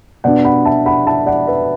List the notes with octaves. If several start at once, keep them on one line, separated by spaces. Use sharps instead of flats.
B2 B3 D4 D5 F#5
F#5 B5
E5 A5
F#5 B5
E5 A5
D5 F#5
B4 E5